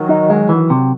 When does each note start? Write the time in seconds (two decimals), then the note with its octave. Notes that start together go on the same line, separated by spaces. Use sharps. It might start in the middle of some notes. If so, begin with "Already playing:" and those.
Already playing: D#3 F#3
0.09 D#4
0.30 G#3
0.49 E3
0.70 C3